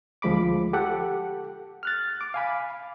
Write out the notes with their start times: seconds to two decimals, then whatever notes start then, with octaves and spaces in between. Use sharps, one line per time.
0.22 D2 F3 G#3 B5 D6
0.73 G4 A4 F#5
1.83 F6 F#6 A6
2.21 D6
2.34 F5 G#5 B5